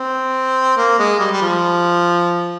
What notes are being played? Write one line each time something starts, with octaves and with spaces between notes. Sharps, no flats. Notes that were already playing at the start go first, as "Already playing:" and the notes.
Already playing: C4
A#3
G#3
G3
G3
F3